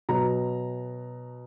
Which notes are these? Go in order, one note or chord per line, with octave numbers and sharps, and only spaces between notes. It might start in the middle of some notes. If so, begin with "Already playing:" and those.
B2 F#3 A#5